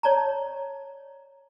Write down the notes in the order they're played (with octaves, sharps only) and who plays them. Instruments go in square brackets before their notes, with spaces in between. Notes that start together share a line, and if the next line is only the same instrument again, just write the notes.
[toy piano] C#5 D5 A5 A#5